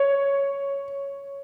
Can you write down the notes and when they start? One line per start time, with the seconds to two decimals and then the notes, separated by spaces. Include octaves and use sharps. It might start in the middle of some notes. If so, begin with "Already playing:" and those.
Already playing: C#5